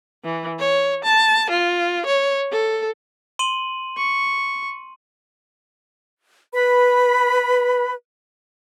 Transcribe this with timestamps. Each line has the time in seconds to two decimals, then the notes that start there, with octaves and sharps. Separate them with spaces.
0.24 E3
0.59 C#5
1.04 A5
1.50 F4
2.06 C#5
2.52 A4
3.39 C6 D#7 F#7
3.97 C#6
6.53 B4 B5